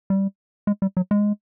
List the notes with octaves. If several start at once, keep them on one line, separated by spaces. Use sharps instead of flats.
G3
G#3
G3
F#3
G#3